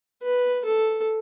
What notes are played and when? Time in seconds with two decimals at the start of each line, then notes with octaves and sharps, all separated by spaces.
0.23 B4
0.65 A4